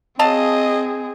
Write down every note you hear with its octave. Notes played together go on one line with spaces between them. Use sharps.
F#3 C4 G#4 D#5 F5 A5